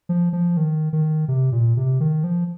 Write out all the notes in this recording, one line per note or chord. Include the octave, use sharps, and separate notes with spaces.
F3
F3
D#3
D#3
C3
A#2
C3
D#3
F3